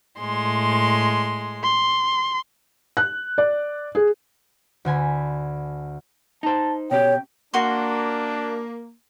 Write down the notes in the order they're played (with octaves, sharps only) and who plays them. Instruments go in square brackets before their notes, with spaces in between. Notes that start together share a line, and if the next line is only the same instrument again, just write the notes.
[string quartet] A2 G#3 C6
[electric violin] C6
[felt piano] F#6
D5
G#4
[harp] D2 D3 G#5 B5
[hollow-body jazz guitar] D#4 C5 [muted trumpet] A5
[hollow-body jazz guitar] B2 C#4 G4 [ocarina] C#5 [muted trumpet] G5
[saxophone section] A#3 [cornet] D4 [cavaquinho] F#4 C6